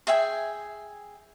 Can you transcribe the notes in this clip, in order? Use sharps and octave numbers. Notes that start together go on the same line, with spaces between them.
G#4 E5 G5 G#5